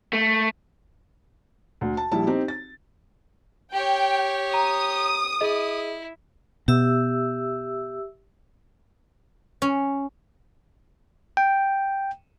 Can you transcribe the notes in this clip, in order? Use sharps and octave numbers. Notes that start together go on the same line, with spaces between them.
A3
D2
A5
A#1 G3 E4 A5
C4 D#4 G4
A6
G4 C#5 G5
A#5 D#6
E4 G#4 D#5
B2 G4 E5 E6
C#4
G5